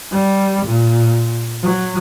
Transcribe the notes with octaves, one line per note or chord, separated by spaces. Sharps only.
G3
A#2
F#3